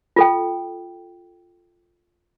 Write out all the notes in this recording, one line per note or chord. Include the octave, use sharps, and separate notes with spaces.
F4 A4 G5